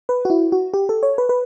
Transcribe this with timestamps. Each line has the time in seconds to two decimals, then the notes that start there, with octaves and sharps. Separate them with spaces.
0.09 B4
0.25 F#4
0.30 E4
0.52 F#4
0.74 G4
0.89 A4
1.03 C#5
1.18 B4
1.29 B4